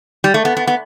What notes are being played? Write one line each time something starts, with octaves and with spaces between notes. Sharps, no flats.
G3
A3
B3
B3
B3